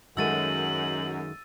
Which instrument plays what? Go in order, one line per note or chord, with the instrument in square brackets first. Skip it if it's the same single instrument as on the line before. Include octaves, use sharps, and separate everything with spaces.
[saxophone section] F#2 [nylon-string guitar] D#3 G#3 A3 [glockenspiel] E6 A6 D#7 [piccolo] F#7